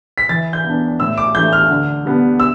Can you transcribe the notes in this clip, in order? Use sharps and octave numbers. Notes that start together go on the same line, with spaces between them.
B6
E3 A6
G6
B3 D4
A2 E6
D6
E3 A3 D4 G6
F6
D3
G3 B3 D4
E6